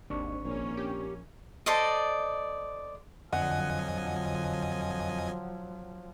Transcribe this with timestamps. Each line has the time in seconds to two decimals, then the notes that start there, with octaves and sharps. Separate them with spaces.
0.10 G#1 D#2 C4 D4 C#6
0.45 A#1 A#3 C#4 C#5
0.77 G4
1.66 A4 C5 D5 D#5
3.33 F2 D3 F3 F#3 D#5 F#5 G#5